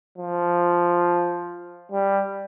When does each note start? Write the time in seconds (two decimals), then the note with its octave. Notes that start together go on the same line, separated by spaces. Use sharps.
0.18 F3
1.92 G3